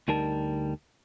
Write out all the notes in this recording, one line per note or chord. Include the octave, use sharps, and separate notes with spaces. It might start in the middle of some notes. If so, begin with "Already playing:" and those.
D2 G3 D#4 A#4 A5